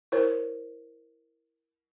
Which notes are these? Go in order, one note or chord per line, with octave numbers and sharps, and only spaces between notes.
E4 A#4 C5 C#5